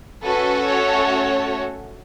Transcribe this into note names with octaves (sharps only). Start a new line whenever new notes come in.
A3 C#4 F#4 A4 B4
C#5